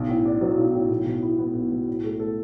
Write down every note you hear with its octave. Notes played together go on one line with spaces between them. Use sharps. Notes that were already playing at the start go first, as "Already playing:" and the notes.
Already playing: B1
A2
D4
F#3
B1
A2
B1
B2
E4
B3
B1
B2
A2
A3
A4